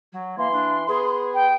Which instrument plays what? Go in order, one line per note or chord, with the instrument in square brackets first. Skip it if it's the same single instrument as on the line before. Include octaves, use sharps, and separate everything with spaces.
[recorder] F#3
[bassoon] E3 [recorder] A#3 [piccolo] C6
[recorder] D4
[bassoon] B3 [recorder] G#4
[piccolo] G5